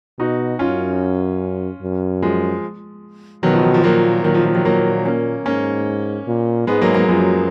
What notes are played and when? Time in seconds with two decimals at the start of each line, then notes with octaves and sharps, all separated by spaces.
0.19 B2 D#4 F#4
0.59 F#2 C#4 F4
1.82 F#2
2.22 F3 G#3
3.43 B2 D#3 F#3
3.53 F3
3.64 D#3
3.74 F3
3.84 A#2 F#3 A#3
4.24 A#2 D#3 F#3
4.34 F3
4.45 F3
4.55 D#3 F#3
4.65 A#2 F#3 A#3
5.05 A#3 C#4
5.46 G#2 A#3 C#4
6.27 A#2
6.67 G#2 G#3 B3
6.82 F#3 A#3
6.94 F#3 A#3
7.09 F#2 F3 G#3